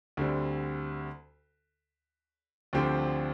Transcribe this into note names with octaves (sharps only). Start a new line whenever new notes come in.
D2 D3 G3 C4
D2 D3 F3 C4 G4